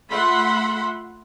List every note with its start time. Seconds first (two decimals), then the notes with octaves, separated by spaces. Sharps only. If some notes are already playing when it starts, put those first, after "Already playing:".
0.10 A3 F4 E5 F#5 B5 C6